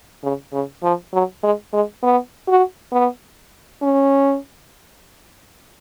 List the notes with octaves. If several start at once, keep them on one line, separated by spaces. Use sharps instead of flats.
C#3
C#3
F3
F#3
G#3
G#3
B3
F#4
B3
C#4